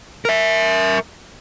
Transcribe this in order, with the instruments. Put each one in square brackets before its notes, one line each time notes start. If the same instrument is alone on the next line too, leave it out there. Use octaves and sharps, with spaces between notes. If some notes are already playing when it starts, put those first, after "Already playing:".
[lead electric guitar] A#4 E5